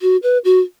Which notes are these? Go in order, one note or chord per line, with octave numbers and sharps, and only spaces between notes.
F#4
B4
F#4